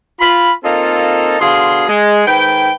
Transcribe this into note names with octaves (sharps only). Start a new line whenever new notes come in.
F4 B5
A#3 C4 D#4 F4 A4
B2 D3 G#4 F5 C6
G#3
G#2 D#3 B4 G5